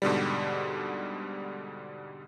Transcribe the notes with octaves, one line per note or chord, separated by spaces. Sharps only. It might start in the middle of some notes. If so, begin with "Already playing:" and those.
G#2 B2 D3 G3